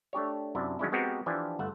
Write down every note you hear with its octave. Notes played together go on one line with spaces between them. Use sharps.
A3 D4 G4 C#5
F#2 C3 D4 E4
D#3 F#3 G#3 C#4 D4 E4
G#3 B3 C4 F#4 G4 A#4
E3 F3 D4 G4 G#5
G1 A3 E5 F#5